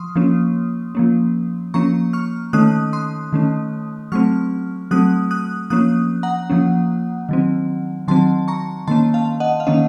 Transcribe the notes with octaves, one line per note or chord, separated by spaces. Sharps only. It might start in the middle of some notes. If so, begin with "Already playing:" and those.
Already playing: F3 C6 C#6 D#6 F6
F3 A#3 C#4
F3 A#3 C#4
F3 A#3 C#4 A#5 C#6
C#6 F6
D#3 A3 C#4 D#6 F#6
C6 D#6
D#3 A3 C#4
F#3 A3 C4 C#6 F6
F#3 A3 C4 D#6 F#6
D#6 F#6
F3 A#3 C#4 D#6 F#6
F#5 A#5
F3 A#3 C#4
D#3 F#3 C4
D#3 F#3 C4 A5 C6
A#5 C#6
D#3 A#3 C#4 A5 C6
F5 A5
D#5 F#5
F5
D#3 A#3 C#4 D#5